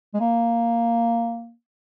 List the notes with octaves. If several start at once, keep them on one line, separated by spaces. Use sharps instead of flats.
G#3
A#3